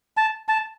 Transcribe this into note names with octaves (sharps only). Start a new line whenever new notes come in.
A5
A5